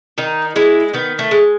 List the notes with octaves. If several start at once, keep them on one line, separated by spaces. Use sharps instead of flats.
D#3 D#4
G#3 E4
D#3 B3
A3
G#3